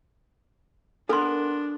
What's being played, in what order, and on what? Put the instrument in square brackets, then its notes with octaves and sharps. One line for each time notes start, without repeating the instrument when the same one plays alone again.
[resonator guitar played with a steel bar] B3 A#4 G#5 [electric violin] D4 [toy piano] A4 C6